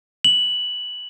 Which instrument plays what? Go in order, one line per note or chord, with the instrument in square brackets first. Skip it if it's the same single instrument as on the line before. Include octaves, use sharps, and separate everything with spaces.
[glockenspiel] F#7